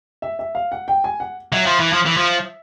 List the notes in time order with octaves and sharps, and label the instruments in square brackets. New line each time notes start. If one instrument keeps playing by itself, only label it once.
[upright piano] E5
E5
F5
F#5
G5
G#5
F#5
[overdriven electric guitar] F#3 [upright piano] E5
[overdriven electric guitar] F3
E3
F3
E3
F3